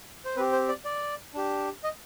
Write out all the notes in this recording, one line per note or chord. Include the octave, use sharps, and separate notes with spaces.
C5
C4 G4 B4
C5
D5
D5
D4 G4
D#5